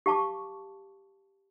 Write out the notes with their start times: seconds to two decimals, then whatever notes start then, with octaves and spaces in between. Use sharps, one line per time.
0.06 G4 F5 A5 C#6 D6